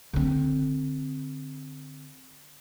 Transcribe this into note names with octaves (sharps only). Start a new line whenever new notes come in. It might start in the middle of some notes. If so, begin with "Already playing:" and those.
D3 C4